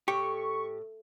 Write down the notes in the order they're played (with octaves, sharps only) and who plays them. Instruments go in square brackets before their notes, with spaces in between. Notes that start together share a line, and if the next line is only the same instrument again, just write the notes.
[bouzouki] A2 [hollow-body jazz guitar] G4 [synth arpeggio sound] C#6